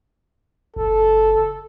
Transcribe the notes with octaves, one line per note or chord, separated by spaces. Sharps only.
F#1 A4